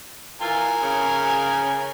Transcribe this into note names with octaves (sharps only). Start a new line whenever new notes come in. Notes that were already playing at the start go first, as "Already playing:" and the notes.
D#3 E3 F4 A#4 G#5
C#3